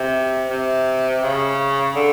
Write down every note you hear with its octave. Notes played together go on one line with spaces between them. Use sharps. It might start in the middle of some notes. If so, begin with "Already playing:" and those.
Already playing: C3
C3
C#3
D3